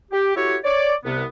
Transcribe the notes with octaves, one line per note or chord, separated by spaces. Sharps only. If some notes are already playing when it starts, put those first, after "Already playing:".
G4
E4 F#4 G4 A4 C#5
C#5 D5
C2 C3 B3